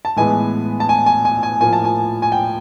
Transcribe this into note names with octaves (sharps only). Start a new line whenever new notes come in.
A5
A2 E3 G#3 B3 G#5
A5
G#5
G#5
G#5
G#5
A2 F3 A#3 G#5
A5
G#5
G#5
G5